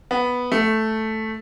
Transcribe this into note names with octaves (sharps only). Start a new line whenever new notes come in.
B3
A3